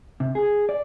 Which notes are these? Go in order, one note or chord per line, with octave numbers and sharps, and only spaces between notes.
C3
G#4
D5